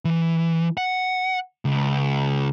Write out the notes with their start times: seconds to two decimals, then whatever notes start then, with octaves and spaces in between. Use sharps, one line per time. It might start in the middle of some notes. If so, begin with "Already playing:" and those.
0.05 E3
0.77 F#5
1.65 C#2